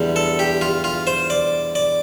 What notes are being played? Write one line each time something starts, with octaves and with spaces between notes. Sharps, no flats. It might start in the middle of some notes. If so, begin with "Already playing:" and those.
Already playing: E2 D3 G3
A4
G4
F4
F4
C5
D5
D5